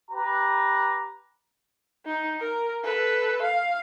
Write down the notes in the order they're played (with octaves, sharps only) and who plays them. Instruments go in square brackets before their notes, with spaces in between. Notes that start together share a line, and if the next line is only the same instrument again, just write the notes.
[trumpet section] G4 B4 A#5
[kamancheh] D#4
A#4
A4 B4
F5